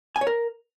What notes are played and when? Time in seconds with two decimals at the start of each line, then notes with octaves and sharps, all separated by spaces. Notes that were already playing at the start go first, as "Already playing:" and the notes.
0.16 G#5
0.21 C#5
0.27 A#4